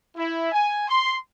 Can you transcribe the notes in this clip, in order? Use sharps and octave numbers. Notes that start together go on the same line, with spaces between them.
E4
G#5
C6